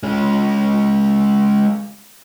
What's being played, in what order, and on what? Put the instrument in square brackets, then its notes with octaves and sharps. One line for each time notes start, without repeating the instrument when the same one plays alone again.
[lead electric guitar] G#3 C#4